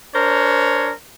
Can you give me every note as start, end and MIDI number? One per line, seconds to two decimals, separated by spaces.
0.15 0.90 62
0.15 0.90 70
0.15 0.90 72
0.15 0.90 73